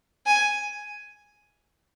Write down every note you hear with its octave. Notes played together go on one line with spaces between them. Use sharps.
G#5